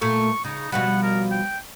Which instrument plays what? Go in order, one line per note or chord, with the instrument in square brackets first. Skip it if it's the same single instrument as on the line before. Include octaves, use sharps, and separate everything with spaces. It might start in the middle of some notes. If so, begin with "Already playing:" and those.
[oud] A#2 A3 A4 [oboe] C#6
[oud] C#3 [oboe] D#4
[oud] B2 F3 G3 [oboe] F#5
[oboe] A#4
G5